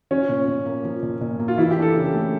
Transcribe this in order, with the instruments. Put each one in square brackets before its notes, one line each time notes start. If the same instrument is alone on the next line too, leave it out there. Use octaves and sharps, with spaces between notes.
[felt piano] F3 [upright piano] C#4
[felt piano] A#2
A#2
A#3
F3
A#2
A#2
A#3
[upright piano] F4
[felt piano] E3 [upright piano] E4
[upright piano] G4
[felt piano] D4
[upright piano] A4
[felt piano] C#3
[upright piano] A4
[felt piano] A3